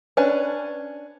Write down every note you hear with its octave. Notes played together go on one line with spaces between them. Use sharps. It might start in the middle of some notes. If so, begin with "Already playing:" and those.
C#4 D4 B4 G#5